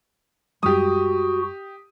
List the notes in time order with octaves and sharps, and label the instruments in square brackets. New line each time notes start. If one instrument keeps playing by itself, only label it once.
[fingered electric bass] F#2 G3 G#3 [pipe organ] F#4 [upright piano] G4 D#6